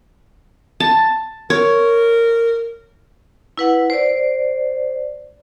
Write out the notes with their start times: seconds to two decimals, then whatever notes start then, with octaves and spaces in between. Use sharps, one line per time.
0.80 A5
1.50 A#4 C#5
3.58 E4 B4 F#5
3.90 C5 D5